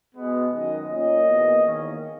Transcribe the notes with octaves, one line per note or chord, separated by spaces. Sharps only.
B2 G#3 B3
F#2 D#3 G#3 D#5
A#2 A#3 C#4 D#5
E2 B2 A#3
E2 D#3 A#3 C#4